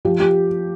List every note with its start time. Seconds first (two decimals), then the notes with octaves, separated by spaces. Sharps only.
0.05 F3 G4
0.20 G4